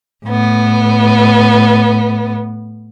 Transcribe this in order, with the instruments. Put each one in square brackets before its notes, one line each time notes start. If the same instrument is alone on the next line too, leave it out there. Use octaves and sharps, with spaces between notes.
[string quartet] A2 B3